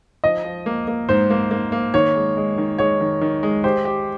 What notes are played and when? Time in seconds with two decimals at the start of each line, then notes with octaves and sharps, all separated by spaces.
0.24 F3 D#5
0.44 F3
0.66 A#3
0.87 A#3
1.09 G#2 C5
1.30 A#3
1.51 A#3
1.72 A#3
1.94 D#3 C#5
2.15 G#3
2.37 G#3
2.58 D#3
2.78 G#3 C#5
3.00 D#3
3.21 D#3
3.43 G#3
3.64 G4 C5
3.85 G4